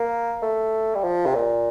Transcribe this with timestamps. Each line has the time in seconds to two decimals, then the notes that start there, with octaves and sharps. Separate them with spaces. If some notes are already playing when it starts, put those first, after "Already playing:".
Already playing: A#3
0.42 A3
0.95 G3
1.04 F3
1.26 C3
1.35 A#2